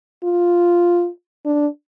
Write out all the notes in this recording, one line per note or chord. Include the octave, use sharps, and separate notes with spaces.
F4
D4